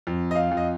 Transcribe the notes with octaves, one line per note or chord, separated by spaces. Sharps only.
F2
D#5
F5
F2
D#5